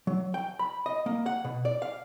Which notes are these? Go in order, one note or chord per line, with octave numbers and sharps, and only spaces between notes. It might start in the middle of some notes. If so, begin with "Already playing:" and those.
F#3
G5
B5
D#5
A#3
F#5
B2
D5
F5